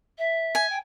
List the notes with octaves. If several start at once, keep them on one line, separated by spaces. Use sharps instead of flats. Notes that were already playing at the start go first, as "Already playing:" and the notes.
E5
G#5
G5